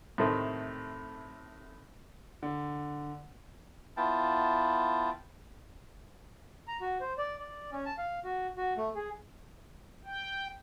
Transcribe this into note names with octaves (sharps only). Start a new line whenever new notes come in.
A2 C3 D#3 A3 C5
D3
B3 E4 F4 G5 A5
A#5
F#4
C5
D5
D5
C#4
A5
F5
F#4
F#4
A3
G#4
G5